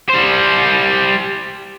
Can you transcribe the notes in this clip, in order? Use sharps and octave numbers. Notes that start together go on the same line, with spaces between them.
G3 C5